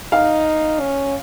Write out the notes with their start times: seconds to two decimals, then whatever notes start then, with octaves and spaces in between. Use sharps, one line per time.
0.12 D#4 F5
0.80 C#4